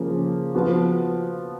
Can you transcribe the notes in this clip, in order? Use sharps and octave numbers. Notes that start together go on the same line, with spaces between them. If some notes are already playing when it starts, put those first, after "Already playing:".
Already playing: C#3 F3 A#3
F3 B3 F#4